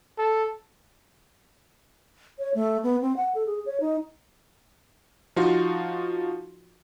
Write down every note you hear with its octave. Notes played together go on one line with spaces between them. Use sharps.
A4
C#5
A3
B3
C4
F#5
A4
G#4
C#5
D#4
F3 D#4 F4 F#4